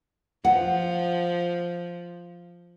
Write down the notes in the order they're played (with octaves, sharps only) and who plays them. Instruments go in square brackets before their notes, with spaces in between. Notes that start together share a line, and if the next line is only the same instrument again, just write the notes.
[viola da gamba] F3 [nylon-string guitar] F#5